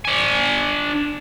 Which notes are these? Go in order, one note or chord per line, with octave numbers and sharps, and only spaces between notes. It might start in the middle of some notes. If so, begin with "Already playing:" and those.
D4 G#5